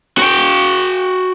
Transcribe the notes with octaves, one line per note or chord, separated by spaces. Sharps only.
F#4 G5